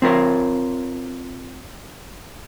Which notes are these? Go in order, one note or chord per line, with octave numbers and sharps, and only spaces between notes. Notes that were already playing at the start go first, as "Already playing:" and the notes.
C4 F4 A#4 C#5